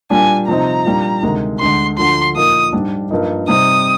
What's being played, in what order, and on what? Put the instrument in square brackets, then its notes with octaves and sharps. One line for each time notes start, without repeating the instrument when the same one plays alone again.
[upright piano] A#2 G3 D4 [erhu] G#5
[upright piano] C3 F3 C4 D#4 [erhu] A#5
[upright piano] A#2 G3 D4
D2 C3 D#3 G#3
[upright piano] D2 D3 G#3 [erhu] C6
[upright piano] D2 D3 F3 [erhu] C6
[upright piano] A#2 F3 A#3 D#4 [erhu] D#6
[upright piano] G#2 G3 D4
G2 F3 A#3 D#4
[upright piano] C3 G3 C4 D#4 [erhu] D#6